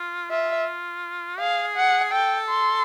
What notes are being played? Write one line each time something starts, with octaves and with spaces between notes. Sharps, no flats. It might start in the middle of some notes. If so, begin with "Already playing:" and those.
Already playing: F4
F4 E5
G#4 F5
F#5
A4 G5
C6